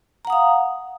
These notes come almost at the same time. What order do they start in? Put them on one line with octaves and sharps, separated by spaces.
A#5 F#5 D#6 F5